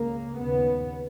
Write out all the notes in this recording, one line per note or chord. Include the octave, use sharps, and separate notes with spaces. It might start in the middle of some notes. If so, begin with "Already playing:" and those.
Already playing: C#2 C#3 A#3
D#2 C#3 B3